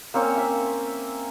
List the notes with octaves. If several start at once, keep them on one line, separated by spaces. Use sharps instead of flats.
A#3 C4 C#4 C#5
E5